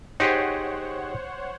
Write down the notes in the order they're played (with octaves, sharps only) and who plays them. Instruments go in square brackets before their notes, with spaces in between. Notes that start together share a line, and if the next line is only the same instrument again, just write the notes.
[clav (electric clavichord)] D#4 G4 G#4 [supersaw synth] C5 C#5 F#5